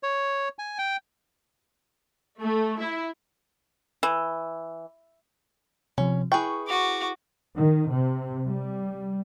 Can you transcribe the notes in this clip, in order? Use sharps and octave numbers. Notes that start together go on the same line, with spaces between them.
C#5
G#5
G5
A3
E4
E3
C3 F3 C#4
E4 G#4 B4 G5 C#6
F#4 D6
D#3
C3
G3